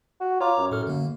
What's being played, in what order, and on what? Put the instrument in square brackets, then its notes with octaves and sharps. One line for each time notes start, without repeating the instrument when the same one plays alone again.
[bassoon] F#4
[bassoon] F4 [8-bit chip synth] C#5 A#5 D6
[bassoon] F#2
[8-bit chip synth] A2 A4 F6
D3 A#3